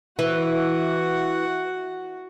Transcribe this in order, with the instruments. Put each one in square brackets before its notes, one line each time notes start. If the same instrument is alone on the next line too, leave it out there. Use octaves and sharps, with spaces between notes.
[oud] E3 [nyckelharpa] F#4 F#5